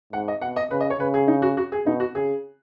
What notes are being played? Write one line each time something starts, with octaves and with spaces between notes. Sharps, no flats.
G#2 F#5
D#5
B2 F#5
D#5
C#3 B4
D#5
C#5
C#3 B4
G#4
D#4
F#4
F#4
G#4
B2 D#4
F#4
C#3 G#4